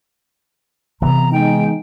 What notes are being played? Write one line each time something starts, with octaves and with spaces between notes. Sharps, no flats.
C3 E3 B3 C4 A#5
G#3 D#4 G5